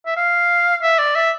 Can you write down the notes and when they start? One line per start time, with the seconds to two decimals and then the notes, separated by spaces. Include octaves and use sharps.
0.06 E5
0.16 F5
0.82 E5
0.99 D5
1.15 E5